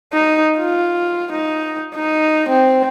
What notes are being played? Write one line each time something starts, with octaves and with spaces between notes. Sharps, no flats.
D#4
F4
D#4
D#4
C4